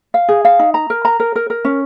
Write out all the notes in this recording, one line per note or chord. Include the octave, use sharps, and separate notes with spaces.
F5
G#4
F5
D#4
A#5
A#4
A#5
A#4
A#4
A#4
C#4